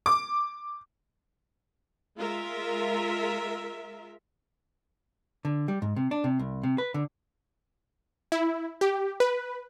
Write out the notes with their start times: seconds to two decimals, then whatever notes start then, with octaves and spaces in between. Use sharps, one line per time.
0.06 D6
2.17 G#3 F4 A#4 E5
5.45 D3
5.68 G3
5.82 G#2
5.96 C3
6.11 D4
6.24 C3
6.39 C2
6.63 C3
6.78 B4
6.94 D3
8.32 E4
8.81 G4
9.20 B4